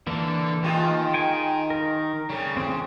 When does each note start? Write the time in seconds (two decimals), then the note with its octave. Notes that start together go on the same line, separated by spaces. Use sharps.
0.07 D3 E3 A#3 A4
0.64 D#3 G#3 F4 G4
1.14 G5 G#5
1.70 A#4
2.30 C#3 G3 A3
2.57 D#2 C4